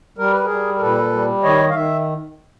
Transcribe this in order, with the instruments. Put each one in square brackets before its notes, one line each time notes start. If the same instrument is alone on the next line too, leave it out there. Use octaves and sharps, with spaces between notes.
[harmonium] G3 A#4
B4
G#4 A#4
G3
A#4
A#2 A4 B4
G3
D#3 C#5 D#5
F5
D#3 E5